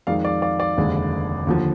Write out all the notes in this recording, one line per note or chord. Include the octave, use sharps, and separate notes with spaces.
F2 D#3 G#3 D5 F5
D5 F5
D5 F5
D5 F5
F1 D#2 D3 G#3
D#2 D3 F3